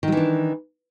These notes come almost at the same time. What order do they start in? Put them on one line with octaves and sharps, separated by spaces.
D#3 F#3 E3 D4